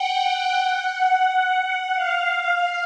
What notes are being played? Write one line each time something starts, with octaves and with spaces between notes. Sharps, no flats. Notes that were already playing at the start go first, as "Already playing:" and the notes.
Already playing: F#5 G5
F#5
F5